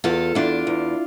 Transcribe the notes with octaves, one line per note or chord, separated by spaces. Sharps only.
E2 F4 A4
E2 D4 F4
E2